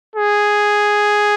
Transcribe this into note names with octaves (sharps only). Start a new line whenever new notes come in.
G#4